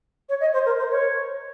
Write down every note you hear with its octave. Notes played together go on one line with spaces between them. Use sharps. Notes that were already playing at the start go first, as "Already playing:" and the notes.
C#5
D#5
C5
A#4
C5
C#5